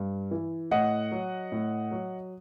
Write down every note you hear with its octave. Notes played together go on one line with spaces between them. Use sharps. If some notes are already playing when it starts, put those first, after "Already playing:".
Already playing: G2
E3
A2 D#5 F#5
F#3
A2
F#3